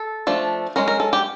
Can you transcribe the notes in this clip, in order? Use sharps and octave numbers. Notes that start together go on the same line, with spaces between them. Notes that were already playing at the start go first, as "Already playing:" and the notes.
Already playing: A4
F3 A3 D4
G#3 C#4 A#4
A#4
A4
G4